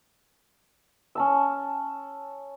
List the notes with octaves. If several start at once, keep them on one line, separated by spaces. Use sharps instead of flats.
C#4 A5 E6